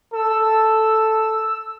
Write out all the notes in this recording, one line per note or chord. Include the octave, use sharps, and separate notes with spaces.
A4 E6